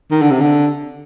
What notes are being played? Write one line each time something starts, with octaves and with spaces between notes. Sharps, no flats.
D#3
D3
C3
D3